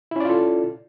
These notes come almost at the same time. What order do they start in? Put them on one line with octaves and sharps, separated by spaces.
E4 C#4 D5 F4 A4